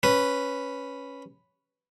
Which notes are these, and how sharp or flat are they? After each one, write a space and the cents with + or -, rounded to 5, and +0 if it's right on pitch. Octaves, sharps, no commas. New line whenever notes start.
C#4 +0 B4 +0